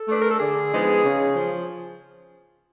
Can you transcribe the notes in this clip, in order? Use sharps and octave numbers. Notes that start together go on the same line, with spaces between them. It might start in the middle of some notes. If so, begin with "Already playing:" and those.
Already playing: A4
A3 D4 B4
A#4
A4
D3 G#4
F3 G#3 B3 D#4
C#3
F3